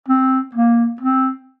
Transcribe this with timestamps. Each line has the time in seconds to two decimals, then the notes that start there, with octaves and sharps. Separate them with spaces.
0.08 C4
0.55 A#3
1.01 C4